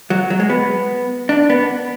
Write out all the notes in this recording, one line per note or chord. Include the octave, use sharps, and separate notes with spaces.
F#3
F#3
G#3
B3
D4
B3